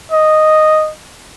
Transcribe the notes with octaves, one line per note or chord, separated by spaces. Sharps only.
D#5